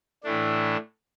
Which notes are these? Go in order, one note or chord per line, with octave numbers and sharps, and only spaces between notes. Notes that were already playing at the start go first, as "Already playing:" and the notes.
A2 E3 A3 D4